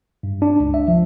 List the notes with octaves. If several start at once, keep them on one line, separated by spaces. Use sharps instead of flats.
G2
D4
C#2
E5
F3